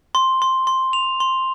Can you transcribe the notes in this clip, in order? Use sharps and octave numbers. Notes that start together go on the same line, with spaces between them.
C6
C6
C6
F7
C6